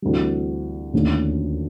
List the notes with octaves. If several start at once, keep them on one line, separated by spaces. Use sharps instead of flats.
D2 C3 E3 G3
D#2 D3 F3 A3 C#4